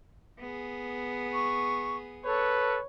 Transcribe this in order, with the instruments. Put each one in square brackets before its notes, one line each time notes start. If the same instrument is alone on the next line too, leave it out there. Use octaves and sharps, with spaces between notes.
[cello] B3 G#4
[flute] C#6
[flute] A4 [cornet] B4 [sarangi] C#5